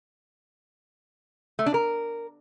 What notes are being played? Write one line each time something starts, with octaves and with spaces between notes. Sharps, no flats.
A3
D4
A#4